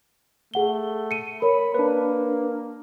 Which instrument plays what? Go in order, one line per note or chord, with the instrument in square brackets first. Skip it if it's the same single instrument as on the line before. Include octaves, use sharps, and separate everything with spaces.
[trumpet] A3 [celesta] G#4 F#5 G7
[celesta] C#7 D#7
[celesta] A#4 C#5 [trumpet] B5
[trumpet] A#3 [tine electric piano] D4 B4